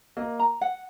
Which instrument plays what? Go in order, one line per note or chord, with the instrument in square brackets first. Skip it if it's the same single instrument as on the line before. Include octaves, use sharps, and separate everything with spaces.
[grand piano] A#3 [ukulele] D#5
[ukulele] A#5
F#5